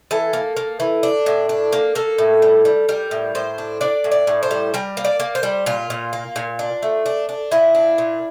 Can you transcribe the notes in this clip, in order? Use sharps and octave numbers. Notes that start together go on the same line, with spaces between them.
E3 A4
A#3
A#3
E3
D4
A2
D4
A#3
A#3 A4
A2
G3
G3
G3 A#4
A2
A2 C5
D4
D4 D5
A2
D5
A2
C5
G3
G3 A#4
A#3
D5
A#3
C5
G3
A#2 F4
A#2
A#3
A#2
D4
A3
D4
D4
A#2 E4
D4
A#2